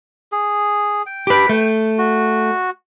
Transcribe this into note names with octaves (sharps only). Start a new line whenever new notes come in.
G#4
G5
G4 B4
A3
F#4